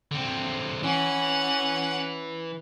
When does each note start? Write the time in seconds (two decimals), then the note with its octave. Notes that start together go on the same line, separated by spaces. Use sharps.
0.11 D3 C4
0.83 E3 C#4 F#5